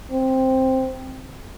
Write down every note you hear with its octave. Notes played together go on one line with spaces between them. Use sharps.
C4